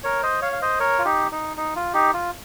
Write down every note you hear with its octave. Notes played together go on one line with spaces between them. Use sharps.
A#4 C#5
C5 D#5
C#5 F5
F5
C5 D#5
A#4 C#5
F4
D#4 G4
D#4
D#4
F4
D#4 G4
F4